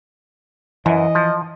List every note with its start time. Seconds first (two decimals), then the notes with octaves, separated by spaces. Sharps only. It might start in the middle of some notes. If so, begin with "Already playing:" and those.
0.86 F#2 E3 D#5
1.15 F3